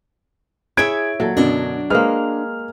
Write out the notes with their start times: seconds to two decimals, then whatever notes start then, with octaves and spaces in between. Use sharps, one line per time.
0.77 E4 G#4 C#5 E5 G#6 D7
1.20 A#2 F#3 A4 F#5
1.37 F#2 B2 D3 D4 F#4
1.90 G#3 A#3 G#4 B4 C5 F6